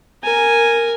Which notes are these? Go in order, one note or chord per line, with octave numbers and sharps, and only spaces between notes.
A#4 G#5